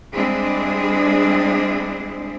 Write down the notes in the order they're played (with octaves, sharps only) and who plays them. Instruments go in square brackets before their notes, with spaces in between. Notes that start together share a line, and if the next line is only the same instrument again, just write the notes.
[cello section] G3 G#3 C4 D4 E4 G#4